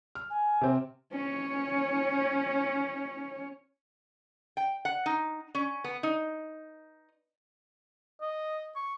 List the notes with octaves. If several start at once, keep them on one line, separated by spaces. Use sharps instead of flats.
F6
G#5
C3 C4
C#4 C#5
G5
F#5
D#4
C#4
B3
D#4
D#5
C#6